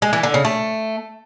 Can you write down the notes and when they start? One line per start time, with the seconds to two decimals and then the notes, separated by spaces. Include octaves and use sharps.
0.02 G#3
0.13 E3
0.23 D3
0.34 C#3
0.45 A3